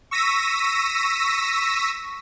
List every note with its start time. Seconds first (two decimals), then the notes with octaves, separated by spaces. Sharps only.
0.11 C#6 E6 A#6 B6 D#7